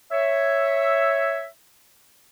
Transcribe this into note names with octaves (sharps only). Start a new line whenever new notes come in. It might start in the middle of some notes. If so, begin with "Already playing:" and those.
C#5 E5